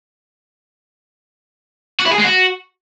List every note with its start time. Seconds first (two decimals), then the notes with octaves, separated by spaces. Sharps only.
2.00 F#4
2.06 E4
2.12 G#4
2.18 G#3
2.24 F#4